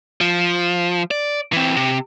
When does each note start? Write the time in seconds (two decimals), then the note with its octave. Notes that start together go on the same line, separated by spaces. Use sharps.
0.21 F3
1.11 D5
1.53 E3 C4
1.77 C3